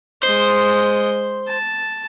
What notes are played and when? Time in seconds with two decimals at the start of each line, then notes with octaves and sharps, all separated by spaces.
0.23 G#3 C5 D#5
1.47 A5